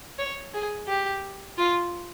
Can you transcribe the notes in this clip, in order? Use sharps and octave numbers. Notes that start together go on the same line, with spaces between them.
C#5
G#4
G4
F4